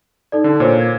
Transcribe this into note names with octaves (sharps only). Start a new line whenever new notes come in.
D#4 A4 D5
D3
A#2 C5 C#5
G#6